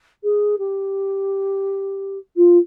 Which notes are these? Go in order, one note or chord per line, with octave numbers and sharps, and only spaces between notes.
G#4
G4
F4